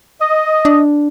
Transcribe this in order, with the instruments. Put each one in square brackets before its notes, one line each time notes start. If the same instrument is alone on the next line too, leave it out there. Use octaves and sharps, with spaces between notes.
[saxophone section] D#5
[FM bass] D4